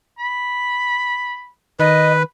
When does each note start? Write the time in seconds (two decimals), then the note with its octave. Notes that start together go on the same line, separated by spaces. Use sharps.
0.18 B5
1.79 D#3 B4 D#5